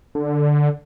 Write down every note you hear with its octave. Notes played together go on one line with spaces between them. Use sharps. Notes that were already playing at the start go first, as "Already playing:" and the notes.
D3